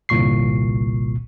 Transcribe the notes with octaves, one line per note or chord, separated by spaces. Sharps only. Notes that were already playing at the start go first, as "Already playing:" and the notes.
G1 C2 A#2 C#6 C7